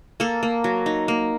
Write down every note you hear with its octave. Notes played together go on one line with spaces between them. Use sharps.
A#3 A4
A#3
F#3
D#4
A#3